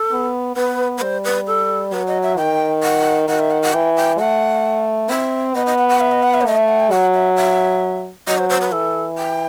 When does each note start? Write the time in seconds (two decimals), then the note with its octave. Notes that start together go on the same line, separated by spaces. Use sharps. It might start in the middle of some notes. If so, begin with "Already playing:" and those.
Already playing: A4
0.11 B3
0.56 B3 B4
0.97 B4
1.02 G3 C5
1.24 B4
1.47 A4
1.92 F#3 B4
2.07 D#5
2.23 E5
2.38 D#3 G5
2.83 F#5
3.28 D#3 F#5
3.39 E5
3.51 F#5
3.63 F#5
3.74 E3 G5
3.96 G5
4.19 A3 F#5
5.10 C4 E5
5.55 B3 D#5
5.66 D#5
5.78 F#5
5.89 F#5
6.01 E5
6.12 D#5
6.23 F#5
6.34 E5
6.41 C5
6.46 A3 D#5
6.58 E5
6.68 F#5
6.80 G5
6.91 F#3 F#5
7.14 E5
7.36 E5
8.27 F#3 D#5
8.38 C5
8.50 C5
8.61 B4
8.72 E3 A4
9.18 G5